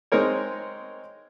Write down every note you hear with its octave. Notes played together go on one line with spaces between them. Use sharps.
G#3 C4 D#4 A#4 C#5